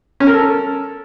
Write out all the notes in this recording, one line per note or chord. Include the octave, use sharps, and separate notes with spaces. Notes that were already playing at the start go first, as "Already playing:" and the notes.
C#4
A#4
A4